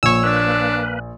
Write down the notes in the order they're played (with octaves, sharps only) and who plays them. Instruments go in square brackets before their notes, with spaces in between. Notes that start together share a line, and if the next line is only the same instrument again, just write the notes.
[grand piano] A#1 [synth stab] C#5 E6
[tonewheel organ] A#3 B4 [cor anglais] D4